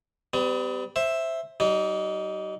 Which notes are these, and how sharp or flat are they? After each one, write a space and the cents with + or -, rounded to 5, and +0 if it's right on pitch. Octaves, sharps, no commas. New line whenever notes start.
G3 -5 B3 +45
C5 +15 E5 +0
G3 -45 D#4 +0